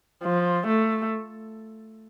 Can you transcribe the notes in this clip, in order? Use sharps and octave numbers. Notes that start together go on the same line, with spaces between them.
F3
A3